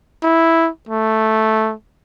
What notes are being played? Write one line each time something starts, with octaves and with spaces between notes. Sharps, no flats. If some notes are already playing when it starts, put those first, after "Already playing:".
E4
A3